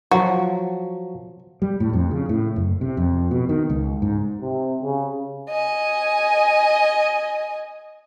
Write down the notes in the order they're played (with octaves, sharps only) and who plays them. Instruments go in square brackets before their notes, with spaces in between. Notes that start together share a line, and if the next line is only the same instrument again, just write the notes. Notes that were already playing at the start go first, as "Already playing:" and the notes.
[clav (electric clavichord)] F3 F#3 [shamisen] F#4
[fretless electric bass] G3
A2
F2
C#3
A2
F#1
C3
F2
B2
D#3
C#2
G#2
[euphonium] C3
C#3
[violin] D#5 G#5